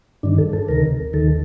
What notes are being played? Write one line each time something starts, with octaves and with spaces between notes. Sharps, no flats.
G2 D#3 D4
A4
A4
D2 C3 D#3 A#4
D#2 D#3 A4